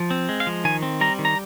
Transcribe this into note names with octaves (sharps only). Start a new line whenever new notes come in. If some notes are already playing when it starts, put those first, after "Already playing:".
Already playing: F3
C4
G#3
F5
F3
D#3 G#5
C4
G3 A#5
D#3
A#5